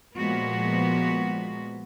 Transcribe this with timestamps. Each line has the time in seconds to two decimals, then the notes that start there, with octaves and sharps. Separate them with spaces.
0.16 A#2 F3 G#3 B3 F#4